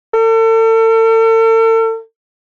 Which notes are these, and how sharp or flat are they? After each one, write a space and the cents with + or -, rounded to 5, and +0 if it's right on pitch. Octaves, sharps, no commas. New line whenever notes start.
A4 +40